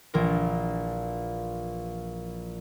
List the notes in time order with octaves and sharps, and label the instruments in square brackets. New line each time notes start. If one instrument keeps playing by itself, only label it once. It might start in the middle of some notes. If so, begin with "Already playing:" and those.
[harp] A#1 E3 F4 A#4